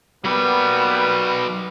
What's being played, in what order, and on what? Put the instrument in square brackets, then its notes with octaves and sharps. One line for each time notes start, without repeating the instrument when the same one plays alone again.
[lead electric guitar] F#3 B4 [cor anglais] G3 [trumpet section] A#3 B3